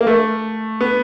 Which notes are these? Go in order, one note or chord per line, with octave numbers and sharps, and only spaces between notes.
A#3
A3
B3